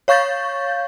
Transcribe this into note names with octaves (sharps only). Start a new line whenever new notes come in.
C#5 F5 C#6 G6 A6